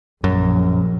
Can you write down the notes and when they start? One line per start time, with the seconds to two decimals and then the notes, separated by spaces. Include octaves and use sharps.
0.24 A#1 F#2